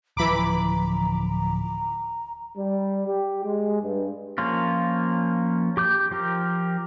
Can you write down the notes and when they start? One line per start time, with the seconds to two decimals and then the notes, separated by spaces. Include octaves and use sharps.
0.17 D1 E3 F3 A#5 B5 D6
2.57 G3
3.06 G4
3.44 G#3
3.82 G2
4.38 F3 A#3 C#4 F4
5.77 G4 D6 G6
6.11 F3 G4 A#4